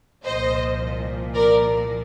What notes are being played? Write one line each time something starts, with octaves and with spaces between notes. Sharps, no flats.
C2 A#2 F3 C5 D#5
A#4 D5